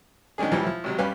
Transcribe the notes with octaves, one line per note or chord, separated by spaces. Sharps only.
D#3 G#3 C#4 D4 G#4
C#2 E3 F3 G3
F3 E4
G#1 C3 F#3
G2 G3 C#4 B4 F5